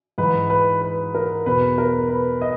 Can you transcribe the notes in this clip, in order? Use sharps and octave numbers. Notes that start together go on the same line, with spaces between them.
G#2 E3 B4
B4
B4
A#4
E2 B2 B4
A#4
B4
D#5